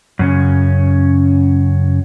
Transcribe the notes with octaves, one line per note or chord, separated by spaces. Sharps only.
F#2 C#3 C#4